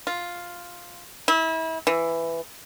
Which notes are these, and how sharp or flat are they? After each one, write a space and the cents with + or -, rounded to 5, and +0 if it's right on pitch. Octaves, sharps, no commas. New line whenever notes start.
F4 +5
E4 -30
E3 +10